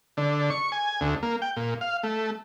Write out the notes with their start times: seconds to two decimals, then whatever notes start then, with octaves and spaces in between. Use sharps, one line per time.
0.17 D3
0.50 C#6
0.72 G#5
1.01 D2
1.23 A#3
1.42 G5
1.56 A#2
1.81 F5
2.03 A3